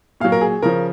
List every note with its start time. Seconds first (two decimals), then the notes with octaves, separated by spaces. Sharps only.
0.20 A#2 F#3 F5
0.32 A#4
0.41 G#4
0.62 C#3 F3 A#4